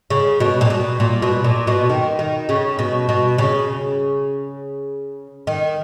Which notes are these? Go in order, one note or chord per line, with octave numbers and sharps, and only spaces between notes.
C#3
B2
A#2
B2
A#2
B2
A#2
B2
D#3
D#3
C#3
B2
B2
C#3
D#3